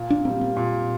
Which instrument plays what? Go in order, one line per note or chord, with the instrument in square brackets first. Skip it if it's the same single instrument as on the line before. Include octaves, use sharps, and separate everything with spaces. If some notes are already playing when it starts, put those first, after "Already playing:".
Already playing: [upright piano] A#2
[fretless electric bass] D4
[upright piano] G3 A#3 [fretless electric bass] C4
[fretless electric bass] C4
[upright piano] A#2